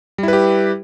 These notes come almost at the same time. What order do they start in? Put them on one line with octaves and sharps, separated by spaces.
G3 E4 B4 G4